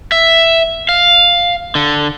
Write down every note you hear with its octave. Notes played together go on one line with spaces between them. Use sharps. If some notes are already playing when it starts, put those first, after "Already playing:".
E5
F5
D3